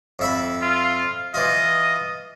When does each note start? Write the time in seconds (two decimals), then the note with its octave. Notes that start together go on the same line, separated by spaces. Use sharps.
0.19 F2 E5 B5
0.62 F4
1.34 E3 F4 D#5